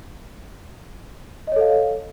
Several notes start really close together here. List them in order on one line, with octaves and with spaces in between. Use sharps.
D#5 C#5 A4 F5